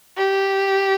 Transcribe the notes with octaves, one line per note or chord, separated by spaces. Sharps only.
G4